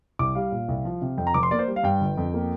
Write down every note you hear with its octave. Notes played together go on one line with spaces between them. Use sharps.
C2 D6
G3 F5
A#2
C2
F3
C3
F2 G5
A#5
F1 D6
C6
A#3 D5
C5
G3
F5
G2 G5
G1
F2
A#3